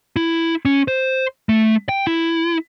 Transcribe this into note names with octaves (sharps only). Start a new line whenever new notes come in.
E4
C#4
C5
A3
G5
E4